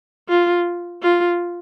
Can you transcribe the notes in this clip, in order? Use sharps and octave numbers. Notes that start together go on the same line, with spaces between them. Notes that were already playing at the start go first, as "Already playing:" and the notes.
F4
F4